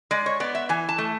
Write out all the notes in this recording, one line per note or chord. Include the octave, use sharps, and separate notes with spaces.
G#3 D5
C#5
B3 D5
E5
E3 G#5
A5
A3